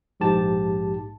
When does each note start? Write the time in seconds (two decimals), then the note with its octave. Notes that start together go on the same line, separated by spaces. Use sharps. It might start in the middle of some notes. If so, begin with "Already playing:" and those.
0.20 A#1 G#2 G4 A5